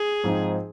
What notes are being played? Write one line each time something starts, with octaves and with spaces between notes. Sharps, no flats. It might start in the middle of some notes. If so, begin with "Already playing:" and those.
Already playing: G#4
G#2 F3 C4 D#4